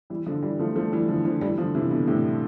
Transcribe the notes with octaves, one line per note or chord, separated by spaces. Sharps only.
E3 G3
D3 F3
E3 G3
F3 A3
F3 A3
E3 G3
D3 F3
D3 F3
E3 G3
D3 F3
C3 E3
B2 D3
A2 C3